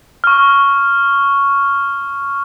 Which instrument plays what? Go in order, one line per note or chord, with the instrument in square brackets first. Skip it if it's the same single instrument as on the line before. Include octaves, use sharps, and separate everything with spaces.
[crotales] C#6 F6